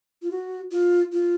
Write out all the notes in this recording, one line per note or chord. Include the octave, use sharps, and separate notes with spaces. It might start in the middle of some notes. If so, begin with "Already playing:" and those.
F4
F#4
F4
F4